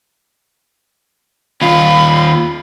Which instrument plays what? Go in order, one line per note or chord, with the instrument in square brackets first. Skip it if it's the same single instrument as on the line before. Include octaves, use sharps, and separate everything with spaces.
[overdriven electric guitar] D#2 F4 [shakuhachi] B5